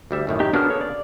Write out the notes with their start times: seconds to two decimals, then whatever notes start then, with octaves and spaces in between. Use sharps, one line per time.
0.11 D2 G3 E5
0.27 F#2 A2 D#3
0.40 D#4 G4
0.53 C#3 A#3 B3 D4 F#4 F6
0.69 A4 C#5
0.81 D5